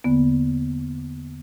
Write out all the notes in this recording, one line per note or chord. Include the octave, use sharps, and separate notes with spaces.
E2 D3 A#3 B3